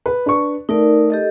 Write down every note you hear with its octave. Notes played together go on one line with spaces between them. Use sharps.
B4
D4 B4 C#6
A3 D#4 A#4 D5
G4 A4 D#5